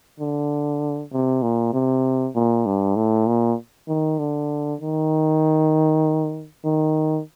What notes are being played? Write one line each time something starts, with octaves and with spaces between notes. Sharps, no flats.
D3
C3
A#2
C3
A#2
G2
A2
A#2
D#3
D3
D#3
D#3